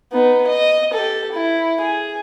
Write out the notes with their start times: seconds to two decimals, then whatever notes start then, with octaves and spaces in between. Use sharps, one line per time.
0.12 B3 D#4
0.47 D#5
0.93 G4 A4
1.32 E4
1.81 G#4